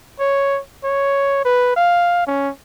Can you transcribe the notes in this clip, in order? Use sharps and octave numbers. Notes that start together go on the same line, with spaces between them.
C#5
C#5
B4
F5
C#4